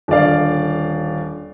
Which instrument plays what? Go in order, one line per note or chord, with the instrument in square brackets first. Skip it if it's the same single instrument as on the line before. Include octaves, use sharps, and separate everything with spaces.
[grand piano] D#1 D3 D5 F5